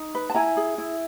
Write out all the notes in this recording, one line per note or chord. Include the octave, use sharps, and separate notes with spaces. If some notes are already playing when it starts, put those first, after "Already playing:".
Already playing: D#4
B4
A5
E4 G#5 A#5
G#4
E4